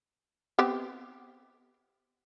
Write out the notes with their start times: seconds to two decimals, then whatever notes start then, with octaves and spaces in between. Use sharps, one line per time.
0.59 B3 C4 G4